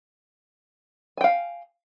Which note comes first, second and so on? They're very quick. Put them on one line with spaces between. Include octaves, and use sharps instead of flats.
G#5 G5 F5